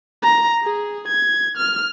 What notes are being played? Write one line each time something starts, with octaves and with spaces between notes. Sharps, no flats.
A#5
G#4
G#6
F6